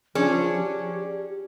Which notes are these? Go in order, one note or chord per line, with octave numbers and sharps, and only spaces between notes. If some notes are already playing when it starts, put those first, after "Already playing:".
F3 C#4 D4 G#4
G4